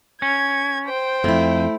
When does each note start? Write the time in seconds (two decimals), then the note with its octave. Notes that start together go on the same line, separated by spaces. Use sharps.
0.22 C#4 G#6
0.87 C5 G5
1.24 F2 A3 E4